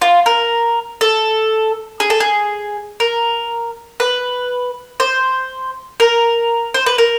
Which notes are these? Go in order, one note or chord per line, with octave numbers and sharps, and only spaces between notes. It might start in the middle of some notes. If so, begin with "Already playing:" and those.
F4
A#4
A4
G#4
A4
G#4
A#4
B4
C5
A#4
C5
B4
A#4